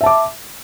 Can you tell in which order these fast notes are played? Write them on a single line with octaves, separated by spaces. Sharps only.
E5 A5 D6